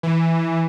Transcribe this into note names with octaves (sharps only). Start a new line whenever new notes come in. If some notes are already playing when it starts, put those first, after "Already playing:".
E3